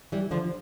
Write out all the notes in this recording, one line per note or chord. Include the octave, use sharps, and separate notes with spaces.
E3 G3
D3 F3